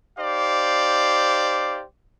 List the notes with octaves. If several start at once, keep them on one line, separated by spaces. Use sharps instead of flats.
D#4 G4 C5 D5 F5